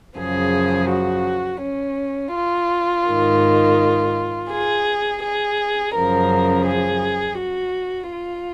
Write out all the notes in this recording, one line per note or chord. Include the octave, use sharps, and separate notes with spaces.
F#2 C#3 F3 G#4
F#4
C#4
F4
G#2 D#3
G#4
G#4
F#2 C#3 F3 A#4
G#4
F#4
F4